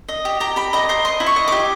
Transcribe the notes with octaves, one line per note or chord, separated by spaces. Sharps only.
D#5
G4
G4 A#5
G4 B5
D#5 A#5
C5 A#5
D#5 C6
E4
C#6
D#5
G4 D6